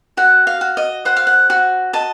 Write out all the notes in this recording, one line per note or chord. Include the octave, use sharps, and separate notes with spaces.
F#4 F#5
F5
F#4
D#5
C5 F#5
F5
F#5
F#4
D#5 A5